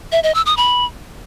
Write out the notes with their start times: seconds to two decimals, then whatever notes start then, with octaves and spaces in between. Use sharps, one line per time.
0.12 E5
0.23 D#5
0.35 E6
0.46 D#6
0.57 B5